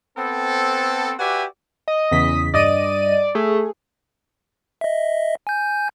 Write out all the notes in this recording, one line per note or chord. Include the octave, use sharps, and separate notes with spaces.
B3 C4 A4
F#4 G4 B4 D5 E5 G#5
D#5
E2 C#3 B6
G2 D5 D#5 D#7
A3 G#4
D#5 E5
G#5 G6